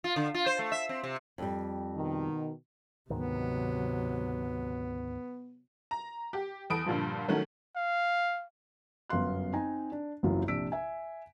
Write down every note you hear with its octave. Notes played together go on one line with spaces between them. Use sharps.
F4
D3
F4
C5
A3
E5
C4
C3
F2 G3
B2 D#3
D2 G#2 C3 D#3 F#3 B3
A#5
G4
E2 A4 B5 D#6 D7
G2 A#2 D3 F3
D#3 F#3 A3 C#4
F5
G1 F#2 B3 F5 C6 F#6
C4 D#4 D#5 G#5 A#5
D4
F#1 C2 F#2 E3 F#3 F4
A#1 C3 D4 E6 B6 D7
E5 G#5